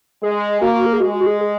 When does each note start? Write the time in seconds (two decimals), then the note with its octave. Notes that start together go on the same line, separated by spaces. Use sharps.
0.23 G#3 G#4
0.61 A#3 F#4
0.86 A#4
0.93 G#4
1.00 G#3 F#4
1.20 F#4
1.26 G#4
1.41 G#4